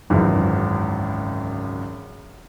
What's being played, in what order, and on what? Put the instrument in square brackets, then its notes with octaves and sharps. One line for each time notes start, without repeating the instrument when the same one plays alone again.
[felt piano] G#1 C#2 F#2 C#3 E3